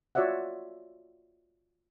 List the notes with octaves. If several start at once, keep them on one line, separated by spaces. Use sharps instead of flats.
F4 F#4 C#5 D5 E5 F#5